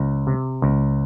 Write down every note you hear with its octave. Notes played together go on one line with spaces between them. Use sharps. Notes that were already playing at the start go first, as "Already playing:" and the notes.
Already playing: C#2
C3
C#2